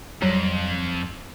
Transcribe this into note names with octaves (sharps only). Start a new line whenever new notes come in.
F2 F#3 G3